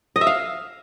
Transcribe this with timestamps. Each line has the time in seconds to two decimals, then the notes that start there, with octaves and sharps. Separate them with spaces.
0.16 D#5
0.21 E5
0.27 F5